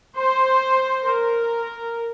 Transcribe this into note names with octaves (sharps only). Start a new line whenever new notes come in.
C5
A#4